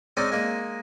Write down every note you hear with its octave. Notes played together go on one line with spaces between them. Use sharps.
G#3 C4 C#4 D#4 D5
G#3 A#3 D#4